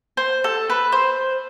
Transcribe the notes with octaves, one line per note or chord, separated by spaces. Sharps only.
C5
A4
B4
C5